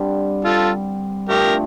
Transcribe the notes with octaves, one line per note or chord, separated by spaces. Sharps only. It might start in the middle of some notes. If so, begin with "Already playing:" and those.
Already playing: G2 D3 G3 C4
F4 A4
G2 F3 A3 G4 A#4